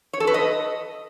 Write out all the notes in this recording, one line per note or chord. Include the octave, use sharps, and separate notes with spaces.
C#5
A4
B4
D#5